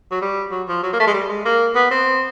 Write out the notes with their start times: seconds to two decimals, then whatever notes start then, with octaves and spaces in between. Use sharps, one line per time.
0.11 F#3
0.22 G3
0.51 F#3
0.68 F3
0.83 F#3
0.93 A#3
1.00 A3
1.07 G#3
1.14 G3
1.29 G#3
1.45 A#3
1.75 B3
1.91 C4